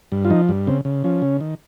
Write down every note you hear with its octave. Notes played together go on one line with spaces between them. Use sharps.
G2
F4
F3 D#4
G2
C#3 C4
C#3
F3 C#4
C#3
D#3